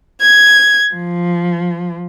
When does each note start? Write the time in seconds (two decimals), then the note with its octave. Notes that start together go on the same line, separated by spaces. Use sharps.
0.22 G#6
0.92 F3